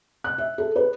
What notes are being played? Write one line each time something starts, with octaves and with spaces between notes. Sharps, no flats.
F#6
E5
A4
B4